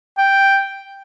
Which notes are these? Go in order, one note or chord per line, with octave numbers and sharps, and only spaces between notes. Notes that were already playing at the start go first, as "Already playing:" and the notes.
G5